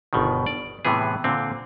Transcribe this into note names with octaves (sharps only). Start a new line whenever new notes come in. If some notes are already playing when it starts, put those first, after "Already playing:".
G1 B2 D#3
D5
A2 C3 E3 B3 G#4
A#2 D3 C4